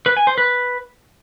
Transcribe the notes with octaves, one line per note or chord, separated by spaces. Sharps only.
B4
G#5
C5
B4